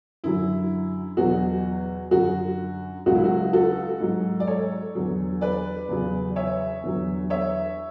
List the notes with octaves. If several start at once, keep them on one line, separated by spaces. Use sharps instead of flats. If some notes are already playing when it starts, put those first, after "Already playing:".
F#2 D3 F#3 E4
E2 B2 F#3 F#4
F#2 D3 F#3 F#4
C#2 C#3 F#3 F#4
E4
F#4
F#4 A4
G#2 F#3
D5
A4 C#5
E2 D3 F#3
B4 D5
E2 C#3 F#3
C#5 E5
E2 D3 F#3
C#5 E5